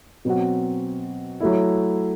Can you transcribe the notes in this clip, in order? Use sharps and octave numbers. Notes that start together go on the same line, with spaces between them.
B2 F#3 C4 F#4
F#3 A3 E4